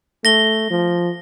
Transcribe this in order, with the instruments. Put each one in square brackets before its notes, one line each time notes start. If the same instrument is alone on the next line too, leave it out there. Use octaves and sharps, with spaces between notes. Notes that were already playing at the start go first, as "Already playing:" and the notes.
[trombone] A3 [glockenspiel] A#6 G7
[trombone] F3